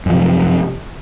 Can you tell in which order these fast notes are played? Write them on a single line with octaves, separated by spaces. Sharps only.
F#2 F3 C3